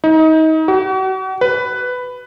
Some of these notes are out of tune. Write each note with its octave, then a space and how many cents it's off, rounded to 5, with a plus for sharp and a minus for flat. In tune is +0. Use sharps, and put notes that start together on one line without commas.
D#4 +30
F#4 +40
B4 +10